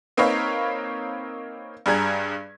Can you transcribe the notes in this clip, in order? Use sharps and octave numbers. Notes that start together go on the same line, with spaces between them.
A#3 C4 D#4 B4 C#5 F5
G2 G3 G#4 A#5 G#6